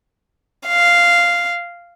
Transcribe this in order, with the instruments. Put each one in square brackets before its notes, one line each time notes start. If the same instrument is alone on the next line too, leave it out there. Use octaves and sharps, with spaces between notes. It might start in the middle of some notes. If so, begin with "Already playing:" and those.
[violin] F5